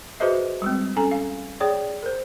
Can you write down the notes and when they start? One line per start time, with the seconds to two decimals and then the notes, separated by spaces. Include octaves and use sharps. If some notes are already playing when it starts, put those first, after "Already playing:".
0.20 F#4 G#4 B4 C5 D#5 E5
0.62 G3 G#3 C4
0.96 C#4 A4 G#5 A#5
1.11 F5
1.60 G#4 C#5 D5 G5
2.03 A#4 C5